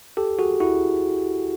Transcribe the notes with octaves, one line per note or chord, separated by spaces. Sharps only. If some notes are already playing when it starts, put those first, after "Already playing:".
G4 A4
F#4 G#4
E4 F#4